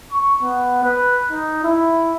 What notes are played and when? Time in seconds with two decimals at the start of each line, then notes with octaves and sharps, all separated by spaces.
0.12 C#6
0.42 B3
0.83 B4
1.31 D#4
1.63 E4